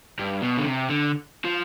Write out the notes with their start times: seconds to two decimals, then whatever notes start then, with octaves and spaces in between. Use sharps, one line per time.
0.19 G2
0.42 B2
0.58 D3
0.65 C3
0.89 D3
1.45 F3